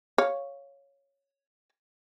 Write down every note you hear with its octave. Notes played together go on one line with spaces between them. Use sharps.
C#5 F5